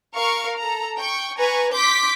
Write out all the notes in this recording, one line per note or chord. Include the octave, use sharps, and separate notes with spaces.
A#4 F5 C#6
A4 A#5
G5 C#6
B4 G#5 A#5 C#6
C6 D6 G6 B6